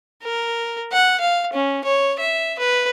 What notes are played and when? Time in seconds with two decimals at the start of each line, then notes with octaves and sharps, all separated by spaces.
0.23 A#4
0.92 F#5
1.20 F5
1.53 C#4
1.84 C#5
2.19 E5
2.59 B4